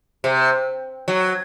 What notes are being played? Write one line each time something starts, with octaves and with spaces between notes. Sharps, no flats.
C3
F#3